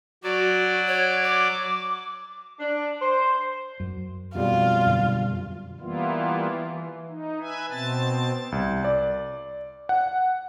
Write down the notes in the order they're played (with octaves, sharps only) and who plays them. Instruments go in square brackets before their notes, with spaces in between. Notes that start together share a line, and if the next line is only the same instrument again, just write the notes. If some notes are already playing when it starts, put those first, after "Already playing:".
[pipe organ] F#3 D5 [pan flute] F#4
[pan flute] C#5
D6
[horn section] D4
C5
[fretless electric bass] F#2
[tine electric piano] F2 B2 G3 [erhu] F4
[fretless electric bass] F#2 D3
[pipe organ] E3 G3 A#3 B3 E4 F4
E3
D#4
B4 E5 G#5
B2 C4 A5 A6
[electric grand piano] C2
D5
F#5